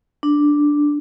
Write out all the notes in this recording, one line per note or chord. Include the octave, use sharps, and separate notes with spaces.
D4